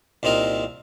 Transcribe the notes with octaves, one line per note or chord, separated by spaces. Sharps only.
C2 A#2 C4 D#4 A#4